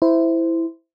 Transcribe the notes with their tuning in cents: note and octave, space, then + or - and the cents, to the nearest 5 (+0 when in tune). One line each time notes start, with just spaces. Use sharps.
E4 +0 C5 -15